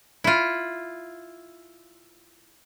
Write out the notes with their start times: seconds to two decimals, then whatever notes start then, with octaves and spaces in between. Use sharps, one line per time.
0.24 E4 F4